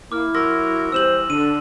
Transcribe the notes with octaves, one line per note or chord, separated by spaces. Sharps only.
A#3 E4 D6 F6
F#3 F#4 A#4 C6 E6 A#6
E3 G3 C4 C5 E6 E7 F#7
D3 D4 D#7